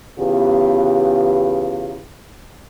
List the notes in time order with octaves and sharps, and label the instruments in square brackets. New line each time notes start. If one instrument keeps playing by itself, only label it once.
[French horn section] E2 C#3 B3 F4 G4